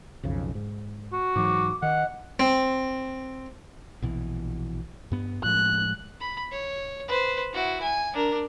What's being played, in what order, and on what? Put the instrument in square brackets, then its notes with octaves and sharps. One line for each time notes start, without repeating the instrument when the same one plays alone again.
[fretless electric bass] B1 F2 C#3
G#2
[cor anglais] F#4
[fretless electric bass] G#2 E3 F#3 [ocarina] D6
[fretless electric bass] D#3 [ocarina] D#5 [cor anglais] F#5
[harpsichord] C4
[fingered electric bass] A#1 B2 E3
G2 B3
[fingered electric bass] A2 F3 G#3 [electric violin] F#6
[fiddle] B5
C#5
B4 C5
E4 F#4
G#5
D4 A#4